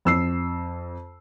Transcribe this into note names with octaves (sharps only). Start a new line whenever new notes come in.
F2 E6 C7